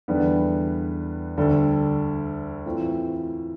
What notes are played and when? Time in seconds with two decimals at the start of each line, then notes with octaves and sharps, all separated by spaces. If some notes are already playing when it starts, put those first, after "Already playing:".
0.08 E2 D3 G3 B3 D4
1.37 D2 D3 G3 D4 A4
2.66 A2 E3 A3 C4 F4